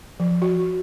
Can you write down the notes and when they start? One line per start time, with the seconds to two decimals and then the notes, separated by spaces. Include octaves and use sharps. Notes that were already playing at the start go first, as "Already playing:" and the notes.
0.20 F3
0.42 F#4